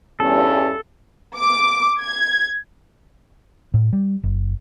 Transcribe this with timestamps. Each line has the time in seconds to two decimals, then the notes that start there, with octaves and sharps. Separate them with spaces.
0.20 E2 G2 C#4 A4
1.36 D6
2.00 G#6
3.74 A2
3.93 G3
4.23 F#1